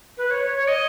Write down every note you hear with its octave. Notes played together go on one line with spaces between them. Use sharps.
B4
C#5
C#5
C#5
D#5